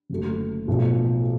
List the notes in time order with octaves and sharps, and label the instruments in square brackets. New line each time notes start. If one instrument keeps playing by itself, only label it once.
[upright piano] F#1 F#2 D3 F#3 A3
B1 A2 F3